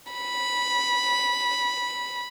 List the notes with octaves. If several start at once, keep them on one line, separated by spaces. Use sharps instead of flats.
B5